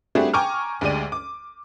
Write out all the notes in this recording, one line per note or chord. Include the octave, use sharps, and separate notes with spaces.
G3 A3 C4 D4 F#4 G#4
G5 G#5 A#5 C#6 D6 F6
D2 G#3 G4 D5 D#7
D6